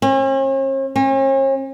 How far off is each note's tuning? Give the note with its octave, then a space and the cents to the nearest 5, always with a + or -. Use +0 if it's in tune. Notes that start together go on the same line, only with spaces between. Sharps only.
C#4 -45
C#4 -45